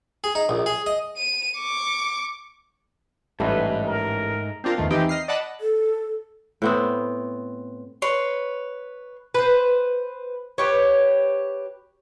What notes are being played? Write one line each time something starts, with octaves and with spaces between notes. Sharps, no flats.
G#4
D#4
A#1
G#4
D#5
D#7
C#6 D6
A1 G#2 G3 A3 B4 A#5
A#4
C4 D4 F4 A#4
E2 D#3 A3 F4
E3 C4 D#4 G4
D#5 F6 C7
D5 D#5 F#5 A5 B5
A4
A2 B3 C4
B4 C#5 C6
B4 C5
G4 B4 C#5